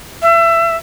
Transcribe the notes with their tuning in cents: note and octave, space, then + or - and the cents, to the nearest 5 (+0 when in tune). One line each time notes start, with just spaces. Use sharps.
E5 +30